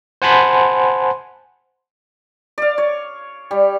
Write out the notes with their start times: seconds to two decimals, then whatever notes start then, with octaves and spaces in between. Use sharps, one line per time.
0.22 C5 F#5 G#5 A5 B5 C6
2.58 D5 F5
2.78 C#5
3.51 G3